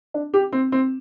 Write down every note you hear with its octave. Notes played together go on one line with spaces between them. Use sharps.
D4
G4
C4
C4